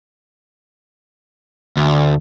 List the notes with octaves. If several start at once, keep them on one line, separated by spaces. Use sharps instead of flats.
D2